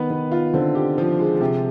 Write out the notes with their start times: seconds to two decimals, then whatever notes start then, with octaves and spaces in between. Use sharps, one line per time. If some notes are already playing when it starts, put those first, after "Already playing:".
Already playing: D#3 B3 B4
0.10 D#3 B3
0.31 F4
0.54 D3 C4
0.75 G4
0.98 F3
1.19 G#3
1.41 C3 G4